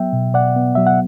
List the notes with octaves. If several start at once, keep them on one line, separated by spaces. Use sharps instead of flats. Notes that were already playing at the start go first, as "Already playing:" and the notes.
Already playing: F#3 B3 E5 G5
B2
B2 D5 F#5
B3
F#3 E5
F#5